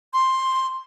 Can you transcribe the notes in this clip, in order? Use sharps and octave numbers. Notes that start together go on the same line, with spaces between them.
C6